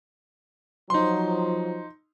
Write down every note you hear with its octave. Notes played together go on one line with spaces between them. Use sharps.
F3 F#3 D#4 C6